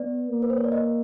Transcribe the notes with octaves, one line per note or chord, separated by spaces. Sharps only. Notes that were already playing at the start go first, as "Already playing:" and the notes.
Already playing: B3 D5
A#3
B4
C5
C#5
D5
D#5